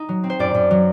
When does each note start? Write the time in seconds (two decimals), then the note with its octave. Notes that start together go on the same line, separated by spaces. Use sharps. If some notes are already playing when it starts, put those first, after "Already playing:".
Already playing: D#4
0.09 F#3
0.24 C4
0.30 C5
0.39 F#2 D5
0.54 F#2
0.71 F#3